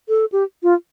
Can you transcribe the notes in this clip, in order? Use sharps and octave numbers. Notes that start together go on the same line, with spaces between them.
A4
G4
F4